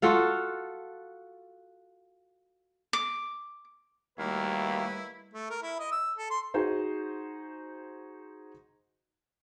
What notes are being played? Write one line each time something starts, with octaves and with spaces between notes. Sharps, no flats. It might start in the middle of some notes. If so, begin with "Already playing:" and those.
F4 F#4 A4 F5
D6
D#2 G3 A3 A#3 E4 F#4 B4 F5
A3
A#4
E4
D#5
E6
A4
C6
D#4 F#4 G#4 C5